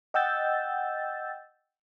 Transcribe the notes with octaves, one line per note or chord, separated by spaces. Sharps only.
D#5 F#5 G5 E6 G6 A6